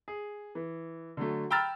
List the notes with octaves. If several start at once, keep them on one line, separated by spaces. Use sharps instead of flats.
G#4
E3
D3 F#3 A3
G5 A#5 B5 E6 F6 A6